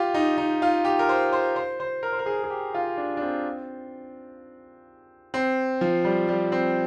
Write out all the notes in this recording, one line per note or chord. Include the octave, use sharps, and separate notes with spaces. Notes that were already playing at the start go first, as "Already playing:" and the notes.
Already playing: F4 G4
D#4
D#4
F4
G4
A#4
C5
C5
C5
C5
A#4
C5
A#4
G#4
G#4
G4
F4
D4
D4
C4
C4
F3
G3
G3
C4